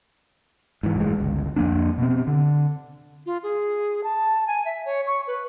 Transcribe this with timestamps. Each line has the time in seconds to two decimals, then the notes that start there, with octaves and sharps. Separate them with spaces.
0.83 G#2 E3
0.96 F#1 A2 E3 G#3
1.18 G1 C#2
1.56 F2 F3 A#3 D4
1.98 B2 C4
2.27 D3
3.26 F4
3.43 G#4
4.04 A5
4.47 G#5
4.65 E5
4.85 C#5
5.07 C#6
5.27 B4